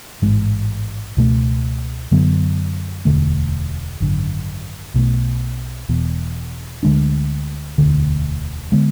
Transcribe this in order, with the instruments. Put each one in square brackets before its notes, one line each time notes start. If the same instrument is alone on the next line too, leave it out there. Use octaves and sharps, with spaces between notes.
[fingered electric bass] A1 G#2 G#3
C#2 B2 A3
F#2 D3 F#3 B3
E1 D2 D3 A3
G#1 F#2 D3
B1 B2 A3
E1 E2 B2
D2 D3 G#3 D4
E1 D2 D3
D3 G#3 B3